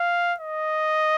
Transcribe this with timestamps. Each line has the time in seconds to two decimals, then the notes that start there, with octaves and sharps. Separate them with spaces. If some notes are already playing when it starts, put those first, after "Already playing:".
Already playing: F5
0.40 D#5